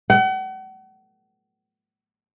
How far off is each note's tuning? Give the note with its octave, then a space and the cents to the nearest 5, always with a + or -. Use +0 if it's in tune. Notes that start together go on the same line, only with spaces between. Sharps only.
F#5 +40